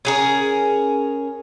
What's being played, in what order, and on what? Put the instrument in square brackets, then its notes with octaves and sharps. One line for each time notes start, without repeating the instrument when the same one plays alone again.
[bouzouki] C#4 G#4 A#4